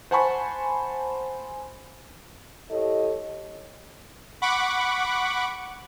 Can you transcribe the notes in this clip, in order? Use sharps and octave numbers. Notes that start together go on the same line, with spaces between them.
C5 F#5 G#5 A5 B5 C#6
E4 G4 A4 C#5 D#5
F#5 B5 C#6 D6